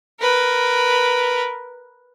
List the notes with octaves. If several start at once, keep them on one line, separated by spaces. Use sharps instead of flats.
A#4 B4